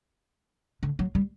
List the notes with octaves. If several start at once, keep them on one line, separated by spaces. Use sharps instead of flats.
D3
F#3
G3